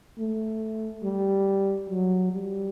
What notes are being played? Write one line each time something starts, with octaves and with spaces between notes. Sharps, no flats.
A3
G3
F#3
G3